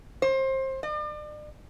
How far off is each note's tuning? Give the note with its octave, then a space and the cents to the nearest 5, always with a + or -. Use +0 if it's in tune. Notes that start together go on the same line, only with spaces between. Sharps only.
C5 +25
D5 +40